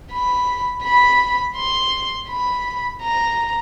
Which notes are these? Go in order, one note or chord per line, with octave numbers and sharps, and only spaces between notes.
B5
B5
C6
B5
A#5